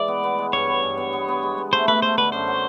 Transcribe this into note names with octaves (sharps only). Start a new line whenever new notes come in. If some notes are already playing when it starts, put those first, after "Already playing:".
Already playing: E3 G#3 D5
B3
B3
G#3
G2 C#5
B3
G2
B3
B3
B3
G#3
B3
A3 C5
A3 B4
A3 C5
D3 B4
F#2 C5
F#3